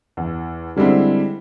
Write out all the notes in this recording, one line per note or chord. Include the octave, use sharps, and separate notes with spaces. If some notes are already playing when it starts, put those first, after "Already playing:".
E2
D3 G3 G#3 C4 E4